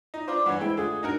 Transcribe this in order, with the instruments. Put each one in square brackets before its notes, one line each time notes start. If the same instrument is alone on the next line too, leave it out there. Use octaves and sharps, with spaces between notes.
[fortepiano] D#4
[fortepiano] D4 F4 C5 [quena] D6
[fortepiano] G2 E3 C#5 [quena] F#5
[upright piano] G#3 C5 [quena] E4 [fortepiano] G5
[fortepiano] D3 [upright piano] A3 F4 [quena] G#4
[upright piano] G#2 D4 [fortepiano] D#4 F#4 A#4